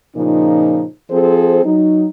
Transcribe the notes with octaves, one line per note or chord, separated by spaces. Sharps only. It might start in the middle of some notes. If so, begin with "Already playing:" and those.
A#2 C#3 F3 D#4
F3 C4 G#4 A4 C5
F#3 D#4